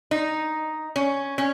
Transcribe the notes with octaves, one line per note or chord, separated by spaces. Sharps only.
D#4
C#4
C#4